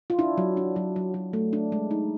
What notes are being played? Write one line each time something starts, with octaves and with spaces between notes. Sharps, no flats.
F4
D4 E4
F#3
D4
F#3
F#3
F#3
A3
D4
G#3
D#4